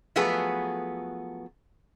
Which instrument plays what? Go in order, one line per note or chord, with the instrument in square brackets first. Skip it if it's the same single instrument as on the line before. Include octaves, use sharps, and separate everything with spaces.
[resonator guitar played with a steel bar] F3 F#3 A3 B3 G#4 B4